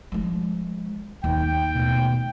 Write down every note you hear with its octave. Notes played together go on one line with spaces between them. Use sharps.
F3 G#3
D#2 G5
B2 A3